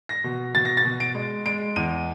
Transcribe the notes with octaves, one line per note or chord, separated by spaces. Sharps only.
A#6
B2
B2 A6
A#6
A6
B2
D7
G#3
G#3 D7
E2 D#7